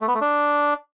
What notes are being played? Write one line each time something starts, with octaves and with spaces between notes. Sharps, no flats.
A3
B3
A3
D4